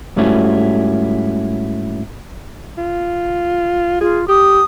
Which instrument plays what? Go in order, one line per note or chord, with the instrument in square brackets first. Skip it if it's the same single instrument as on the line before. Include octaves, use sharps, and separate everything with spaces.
[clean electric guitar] G#2 G3 A3 C#4 E4 F#4
[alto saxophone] F4
[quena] F4 [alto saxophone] G#4
[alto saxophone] G4 [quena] D#6